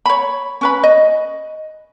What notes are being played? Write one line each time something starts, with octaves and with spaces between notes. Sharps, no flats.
C#5 B5
C#4 B4 B5
D#5